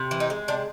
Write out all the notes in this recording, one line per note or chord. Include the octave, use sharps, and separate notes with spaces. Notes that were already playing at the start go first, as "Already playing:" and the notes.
Already playing: C3
E3
D#4
G#3
C3 D4